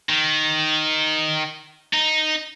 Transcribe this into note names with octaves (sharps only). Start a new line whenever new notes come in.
D#3
D#4